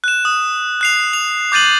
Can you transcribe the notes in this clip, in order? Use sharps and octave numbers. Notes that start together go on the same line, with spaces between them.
F#6 E7
D#6
F#6 C7 F7
F7
D6 G6 A6 D#7 F#7